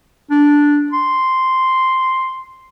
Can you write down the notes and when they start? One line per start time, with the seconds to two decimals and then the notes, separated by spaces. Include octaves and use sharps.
0.31 D4
0.92 C6